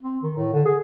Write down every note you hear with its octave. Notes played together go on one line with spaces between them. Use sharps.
C4
D#3
A2
D3
G#4